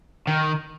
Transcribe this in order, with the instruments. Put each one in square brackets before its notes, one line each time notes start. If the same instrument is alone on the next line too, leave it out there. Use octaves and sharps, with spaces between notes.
[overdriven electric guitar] D#3